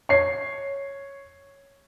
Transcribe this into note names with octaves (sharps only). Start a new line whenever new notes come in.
C#5 C7